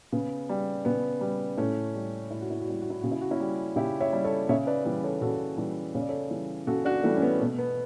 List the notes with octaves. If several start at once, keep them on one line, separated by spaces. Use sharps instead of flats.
C#3 B3
G3
C#3 B3
G3
A2 A3 C#4
G3
A2 E4
F#4
E4
F#4
G3 E4
F#4
E4
C#3 F#4
E4
F#4
C#4 E4
G3
C#3 E4 G4
C#5 E5
G3
A4 C#5
C#3 C#5 E5
B4 D5
E3 G3
A4 C#5
C#3 F#4 A4
E3 G3
C#3 C#5
D5
A4 C#5
E3 G3
C#3 F#4 A4
D4 F#4
E3 G3 A3
C#4
B3
B2 A3
B3